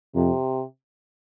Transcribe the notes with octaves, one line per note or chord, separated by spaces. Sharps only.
F2 C3